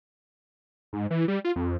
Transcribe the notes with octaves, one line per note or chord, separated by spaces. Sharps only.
G#2
E3
G3
F4
F2